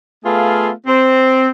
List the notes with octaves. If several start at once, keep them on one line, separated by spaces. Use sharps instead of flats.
A3 B3 F4 G#4 F5
C4